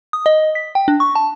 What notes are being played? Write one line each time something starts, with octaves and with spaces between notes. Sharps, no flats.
D#6
D#5
B6
G5
D4
C#6
A5